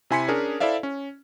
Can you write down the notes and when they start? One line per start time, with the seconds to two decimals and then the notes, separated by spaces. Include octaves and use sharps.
0.10 C3 E4 G#5 C6 B6 C#7
0.28 C#4 D4 G#4 A#4
0.60 E4 A4 C5 D5 E5 F5
0.83 C#4